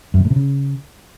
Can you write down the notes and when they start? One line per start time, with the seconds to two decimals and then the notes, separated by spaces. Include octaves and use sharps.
0.14 F#2
0.19 C#3
0.25 A2
0.30 C3
0.36 C#3